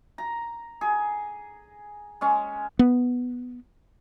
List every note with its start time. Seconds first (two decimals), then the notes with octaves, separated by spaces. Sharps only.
0.18 A#5
0.81 G#4
2.21 G#3 C#4
2.79 B3